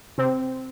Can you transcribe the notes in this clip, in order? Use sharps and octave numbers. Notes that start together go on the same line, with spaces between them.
C3 C4